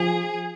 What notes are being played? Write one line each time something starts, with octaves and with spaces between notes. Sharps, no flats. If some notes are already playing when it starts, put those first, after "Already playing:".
Already playing: F3 G#4